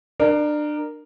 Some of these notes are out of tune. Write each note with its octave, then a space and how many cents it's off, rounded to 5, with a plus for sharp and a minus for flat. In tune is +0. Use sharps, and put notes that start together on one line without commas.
D4 +30 A#4 +0